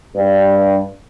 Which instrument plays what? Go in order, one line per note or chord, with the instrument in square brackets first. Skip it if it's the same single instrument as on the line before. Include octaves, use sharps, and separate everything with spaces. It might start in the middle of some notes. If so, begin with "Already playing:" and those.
[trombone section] G2